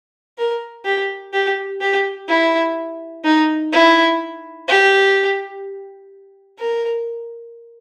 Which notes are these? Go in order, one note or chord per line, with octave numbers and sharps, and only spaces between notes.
A#4
G4
G4
G4
E4
D#4
E4
G4
A#4